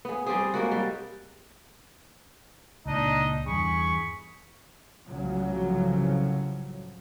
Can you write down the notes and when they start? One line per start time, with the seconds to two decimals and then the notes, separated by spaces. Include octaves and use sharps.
0.05 B3 G#4
0.26 G3 C4 G4 G#4
0.54 G#3 A#3 F#4
0.71 G3
2.86 C#2 A#2 D4 D#4 D#5
3.46 E2 G2 G#4 B5 C#6
5.07 C2 A2 C#3 F3 F#3